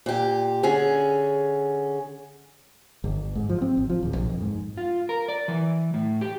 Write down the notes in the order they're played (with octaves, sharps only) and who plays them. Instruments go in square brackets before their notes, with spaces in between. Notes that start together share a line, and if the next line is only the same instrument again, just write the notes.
[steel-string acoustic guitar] A#2 G4
D3 C#4 G#4
[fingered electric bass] G1
G#2
F3
C4
G#1
F3
D1
A#1
F2
G#2
[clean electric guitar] F4
A#4
D5
E3
A2
G4